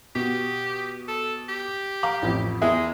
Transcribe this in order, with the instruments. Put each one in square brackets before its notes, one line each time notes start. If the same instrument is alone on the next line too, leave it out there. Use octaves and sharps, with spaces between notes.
[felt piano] B2 [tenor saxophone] G4
[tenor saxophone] A4
G4
[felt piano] F5 A#5 D6
A1 F2
[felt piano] E2 G#4 E5 [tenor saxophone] G#3